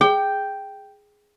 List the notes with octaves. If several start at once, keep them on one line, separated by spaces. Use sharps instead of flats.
G#4 G5